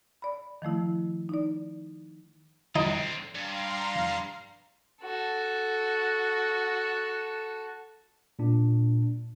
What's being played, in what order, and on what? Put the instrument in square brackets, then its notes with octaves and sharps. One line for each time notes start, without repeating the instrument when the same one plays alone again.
[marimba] D5 B5
D#3 F3 A3 E4
D#4 D5
[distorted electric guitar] D3 C4 [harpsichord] D#4
[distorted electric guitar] G2 [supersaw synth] F5 A#5 C6
[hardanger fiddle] F#4 A4
[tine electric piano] A#2 D4